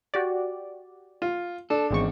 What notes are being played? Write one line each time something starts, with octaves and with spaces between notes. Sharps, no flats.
F#4 G4 D5
F4
D4 A4
G#1 E2 G#2 G#3 C4 C#6